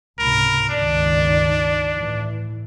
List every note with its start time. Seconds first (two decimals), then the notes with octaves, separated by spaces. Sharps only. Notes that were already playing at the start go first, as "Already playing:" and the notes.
0.19 C#2 G#2 C3 A#4 B5
0.70 G1 C#2 D#3 D4 D5
1.94 A2 E3